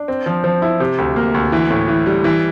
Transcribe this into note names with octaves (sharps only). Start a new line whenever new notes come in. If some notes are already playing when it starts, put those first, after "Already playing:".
Already playing: D4
C4
F3
F3
E4
C3
D2
A#3
D2
E3
A2
E3
G3
E3